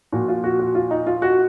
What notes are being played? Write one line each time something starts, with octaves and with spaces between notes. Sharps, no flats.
A#2 F3 F#4
F4
F#4
F#4
F4
D#4
F4
F#4